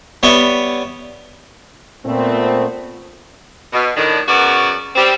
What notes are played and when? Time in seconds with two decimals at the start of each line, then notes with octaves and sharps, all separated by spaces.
0.23 G3 B3 C#5 E5
2.05 A#2 A3 B3 C4
3.73 B2
3.96 A2 D#3 D4
4.27 F#2 C#3 B3 F#4 A#4 D5
4.95 G3 C4